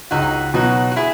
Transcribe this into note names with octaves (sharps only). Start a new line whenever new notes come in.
C#2 D#4 F#4
B2 F#3 D#4 F#4
F#4
E4 G#4